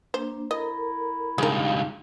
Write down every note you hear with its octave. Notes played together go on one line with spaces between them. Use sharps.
A#3 D4 C5
E4 A4 A#4 D#5 A#5
C#2 G2 G#3 D#4 G4 A#4 F5